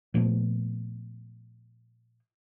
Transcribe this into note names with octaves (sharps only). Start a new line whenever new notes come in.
A#2 F3 A3 B3